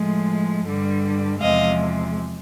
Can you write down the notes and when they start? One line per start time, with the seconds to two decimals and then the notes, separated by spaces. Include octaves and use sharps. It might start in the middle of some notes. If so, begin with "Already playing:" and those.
Already playing: A2 F3 G#3
0.65 G2 D3 G3
1.41 E2 C3 F3 G#3 D#5 F5